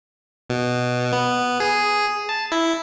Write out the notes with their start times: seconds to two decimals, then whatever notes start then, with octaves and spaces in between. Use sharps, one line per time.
0.50 B2
1.13 B3
1.60 G#4
2.29 A5
2.52 E4